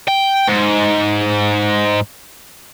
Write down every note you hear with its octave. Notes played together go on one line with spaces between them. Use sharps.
G5
G#2